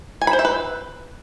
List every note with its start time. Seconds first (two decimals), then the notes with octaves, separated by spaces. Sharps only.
0.21 G#5
0.27 B5
0.33 C5
0.39 E5
0.45 B4